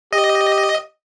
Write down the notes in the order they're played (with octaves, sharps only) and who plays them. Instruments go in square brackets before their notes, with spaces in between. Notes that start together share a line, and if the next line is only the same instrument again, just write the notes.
[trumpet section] G4 [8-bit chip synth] D#5